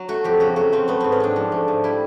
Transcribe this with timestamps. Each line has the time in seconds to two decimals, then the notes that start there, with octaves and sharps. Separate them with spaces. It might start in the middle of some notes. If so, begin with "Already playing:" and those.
Already playing: F#3
0.08 A3 F#4
0.24 F2 G4
0.40 C#3 F#4
0.56 F#3 F#4
0.72 A3 C4
0.88 A3 B3
1.00 G#2 C4
1.12 C#4
1.20 G#2 D4
1.36 F3
1.52 A3
1.68 G#2
1.84 G3 E4